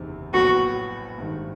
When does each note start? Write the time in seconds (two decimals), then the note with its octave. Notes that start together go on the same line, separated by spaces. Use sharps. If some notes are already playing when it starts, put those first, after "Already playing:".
Already playing: F#1 E2 C3 D#3
0.33 A#1 A2 F#3 B3 F#4
1.18 G#1 G2 D#3